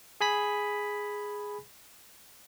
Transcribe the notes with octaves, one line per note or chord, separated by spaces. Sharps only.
G#4 G#5 B5 B6